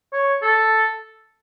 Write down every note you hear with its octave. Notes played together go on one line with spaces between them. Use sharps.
C#5
A4